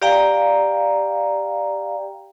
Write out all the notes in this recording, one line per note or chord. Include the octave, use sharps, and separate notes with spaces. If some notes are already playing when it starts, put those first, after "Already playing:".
G4 D5 F5 G5 A#5